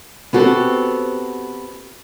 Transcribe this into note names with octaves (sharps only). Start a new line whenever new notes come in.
B3 C4 F#4 G4 A4